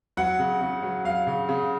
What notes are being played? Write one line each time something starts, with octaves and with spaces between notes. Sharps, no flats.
F#3 F#5
C#3
C#3
F#3
F#3 F5
C#3
C#3